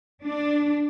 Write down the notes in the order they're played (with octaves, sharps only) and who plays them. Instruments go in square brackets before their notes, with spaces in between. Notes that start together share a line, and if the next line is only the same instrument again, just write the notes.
[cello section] D4